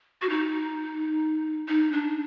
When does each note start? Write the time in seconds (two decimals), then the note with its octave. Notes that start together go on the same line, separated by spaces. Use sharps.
0.22 F#4
0.29 D#4
1.68 D#4
1.92 D4